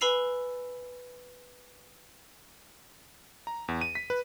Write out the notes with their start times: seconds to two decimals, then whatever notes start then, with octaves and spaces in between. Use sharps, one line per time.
0.01 B4 G#5 B5 E6 C7 F7
3.47 A#5
3.68 E2
3.81 D#7
3.95 B6
4.10 B4